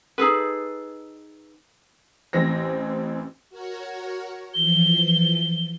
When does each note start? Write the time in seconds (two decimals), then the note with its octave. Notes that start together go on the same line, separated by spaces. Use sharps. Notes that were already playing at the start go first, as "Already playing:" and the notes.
0.18 D#4 G#4 A4 B4
2.33 A1 E3 C4 A#6
3.50 F#4 A#4 C#5
4.54 E3 F3 G7